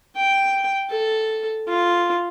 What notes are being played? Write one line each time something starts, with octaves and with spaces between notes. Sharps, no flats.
G5
A4
F4